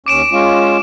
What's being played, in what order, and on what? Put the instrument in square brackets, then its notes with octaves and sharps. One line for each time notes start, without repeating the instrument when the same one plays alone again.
[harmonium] D#2 C#4 [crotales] D6 D7 E7
[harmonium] G#3 C#4 F4